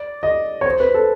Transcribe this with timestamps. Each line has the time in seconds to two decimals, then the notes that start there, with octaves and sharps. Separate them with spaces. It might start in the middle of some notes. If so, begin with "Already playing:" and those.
Already playing: D5
0.23 D#5
0.61 C#5
0.66 C5
0.80 B4
0.94 A4